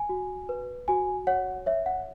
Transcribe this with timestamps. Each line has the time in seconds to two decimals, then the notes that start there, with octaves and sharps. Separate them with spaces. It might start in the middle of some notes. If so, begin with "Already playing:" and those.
Already playing: G#5
0.09 F#4
0.49 B4
0.88 F#4 G#5
1.27 C#5 F#5
1.66 C#5 E5
1.86 F#5